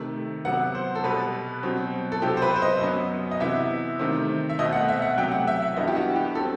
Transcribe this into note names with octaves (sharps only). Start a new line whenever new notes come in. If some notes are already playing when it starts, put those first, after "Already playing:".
Already playing: C3 D#3 A3
C3 F#3 B3 F#5
C5
A4
B2 G3 B3 B4
B2 F#3 C4
A4
C3 F#3 C4 G4
C5
B4
C5
D#5
F#2 F#3 B3
D#5
C3 E3 B3 E5
C3 D#3 A3 C4
E5
B2 A3 C4 D#5
F#5
E5
F#5
C3 F#3 A3 G5
F#5
E5
E5
G2 E3 G3 B3 D#5
G4
F#4
G4
F#3 C4 A4